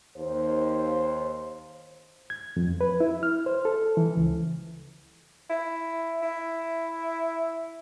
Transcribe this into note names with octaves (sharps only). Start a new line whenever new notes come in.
D#2 C5
G#6
F2
B4
E4
F6
C5
A4
E3
C#2
E4
E4